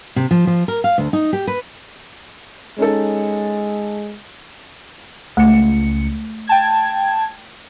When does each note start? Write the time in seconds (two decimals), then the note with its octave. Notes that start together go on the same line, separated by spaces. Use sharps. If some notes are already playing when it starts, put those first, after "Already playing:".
0.16 C3
0.31 F3
0.47 F3
0.68 A#4
0.84 F5
0.98 D2
1.13 D#4
1.33 G4
1.47 B4
2.78 G#3 C#4 D#4 A4
5.37 C#2 A3 C#7
6.47 G5 A5 G#6